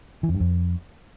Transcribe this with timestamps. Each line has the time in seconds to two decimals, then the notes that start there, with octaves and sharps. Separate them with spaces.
0.23 E3
0.29 F2
0.35 G2
0.40 F2